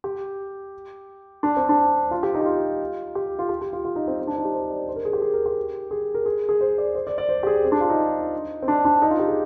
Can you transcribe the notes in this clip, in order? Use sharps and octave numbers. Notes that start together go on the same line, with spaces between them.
G4
D4
C4
D4
F4
G4
D#4
G4
F4
G4
F4
G4
G4
F4
F4
D#4
C4
C4
D4
D#4
G4
C5
D5
C5
A#4
G#4
G4
G#4
A#4
G4
G#4
A#4
G#4
G#4
C5
D5
C5
D5
D5
C5
G4
G#4
C4
D4
F4
D#4
C4
D4
D4
D#4
F4
G4
G#4